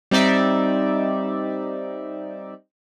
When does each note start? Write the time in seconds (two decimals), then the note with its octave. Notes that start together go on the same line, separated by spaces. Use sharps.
0.11 G3 C4 D#4 D5 E5